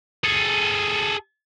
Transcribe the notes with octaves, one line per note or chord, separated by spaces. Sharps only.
G#4 A4